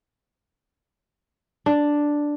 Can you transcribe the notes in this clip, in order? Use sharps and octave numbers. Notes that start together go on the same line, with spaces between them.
D4